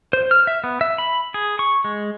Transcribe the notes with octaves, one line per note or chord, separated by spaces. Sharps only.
C5
F6
E5
B3
E5
B5
G#4
C#6
G#3